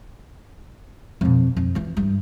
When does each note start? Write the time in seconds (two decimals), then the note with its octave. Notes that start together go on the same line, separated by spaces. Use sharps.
1.21 F2 B2
1.57 F2
1.75 E3 F4
1.97 G2